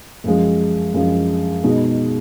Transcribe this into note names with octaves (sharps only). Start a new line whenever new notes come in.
F#2 F3 G#3
F#2 F3 G#3
B2 G#3 D#4 G#4